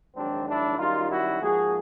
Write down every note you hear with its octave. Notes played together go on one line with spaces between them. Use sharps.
A#1 G#2 D#3 F#3 C4 D4
D4 E4
F#2 D#3 G3 D#4 F4
E4 F#4
G#2 F3 A#3 F#4 G#4